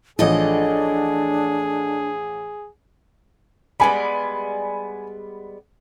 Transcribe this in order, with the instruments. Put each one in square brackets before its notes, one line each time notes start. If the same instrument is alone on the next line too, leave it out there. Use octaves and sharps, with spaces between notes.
[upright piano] A1 F3 [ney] D4 [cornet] G#4 [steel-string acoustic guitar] A4 D#5
[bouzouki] G3 G#3 B3 [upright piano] G#5 B5